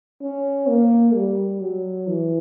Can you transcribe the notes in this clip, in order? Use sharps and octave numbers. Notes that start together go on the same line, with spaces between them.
C#4
A#3
G3
F#3
E3